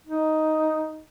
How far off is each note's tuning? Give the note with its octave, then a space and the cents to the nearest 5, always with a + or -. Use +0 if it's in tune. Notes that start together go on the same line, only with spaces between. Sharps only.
D#4 +5